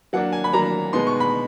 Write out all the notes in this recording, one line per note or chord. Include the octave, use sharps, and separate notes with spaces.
F#3 A#3 D4 F#5
G#5
B5
F#3 A#3 D4 A#5
B2 G#3 B3 D#4 C6
C#6
B5